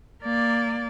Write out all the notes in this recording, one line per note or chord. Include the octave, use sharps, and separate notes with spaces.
A#3 D5